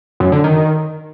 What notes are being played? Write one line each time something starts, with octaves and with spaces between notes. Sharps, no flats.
F#2
D3
D#3